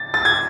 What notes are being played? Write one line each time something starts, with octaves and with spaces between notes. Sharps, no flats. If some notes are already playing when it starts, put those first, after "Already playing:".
Already playing: A6
A6
G#6